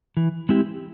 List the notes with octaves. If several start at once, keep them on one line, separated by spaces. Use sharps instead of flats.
E3
G#3 C4 E4 G4